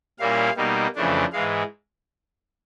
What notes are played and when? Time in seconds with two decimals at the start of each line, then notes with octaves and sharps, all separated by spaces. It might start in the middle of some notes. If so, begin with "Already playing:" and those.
0.19 A#2 G3 A#3 C#4 E4 F5
0.56 B2 G3 A#3 D#4
0.95 F2 C#3 E3 A3 D4
1.32 G#2 E3 G#3 F5